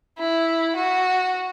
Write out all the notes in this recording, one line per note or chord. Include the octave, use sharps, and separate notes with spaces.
E4
F#4